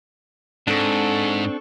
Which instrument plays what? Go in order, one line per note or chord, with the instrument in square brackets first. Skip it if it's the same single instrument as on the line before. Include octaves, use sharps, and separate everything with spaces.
[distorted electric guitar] G#2 [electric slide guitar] C4 D4 [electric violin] A4 C#6